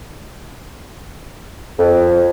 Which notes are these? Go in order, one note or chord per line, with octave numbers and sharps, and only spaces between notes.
F2